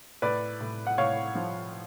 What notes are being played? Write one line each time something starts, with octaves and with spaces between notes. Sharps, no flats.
A2 B4 D5
A2
F#5
A2 C#5 F5
F3